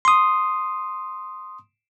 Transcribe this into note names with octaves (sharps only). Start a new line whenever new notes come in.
C6 D#6